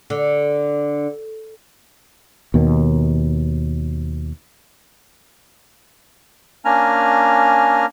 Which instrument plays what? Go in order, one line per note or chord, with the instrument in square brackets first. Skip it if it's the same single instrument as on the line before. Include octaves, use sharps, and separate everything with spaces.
[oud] D3
[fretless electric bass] D#2 B2 D#3
[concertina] A#3 C#4 D4 G#5 A#5 F6